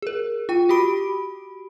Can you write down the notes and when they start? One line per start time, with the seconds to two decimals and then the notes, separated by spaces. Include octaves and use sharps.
0.02 G#4 A#4
0.49 F4 G5
0.69 F#4 G4 B5 D7